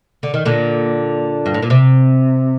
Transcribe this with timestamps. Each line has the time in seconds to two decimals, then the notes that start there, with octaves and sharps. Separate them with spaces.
0.23 D3
0.34 D#3
0.45 A#2 D3
1.46 G2
1.54 A2
1.62 A#2
1.70 C3